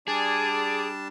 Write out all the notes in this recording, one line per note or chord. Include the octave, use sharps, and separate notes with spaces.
G3 D4 G#4 D5 A5